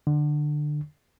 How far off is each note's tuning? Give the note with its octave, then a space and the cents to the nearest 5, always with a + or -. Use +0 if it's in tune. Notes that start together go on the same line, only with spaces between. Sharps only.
D3 +20